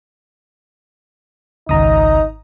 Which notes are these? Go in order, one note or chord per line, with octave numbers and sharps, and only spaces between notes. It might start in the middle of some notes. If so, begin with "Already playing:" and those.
G#1 C#2 D#4 A#5 D#6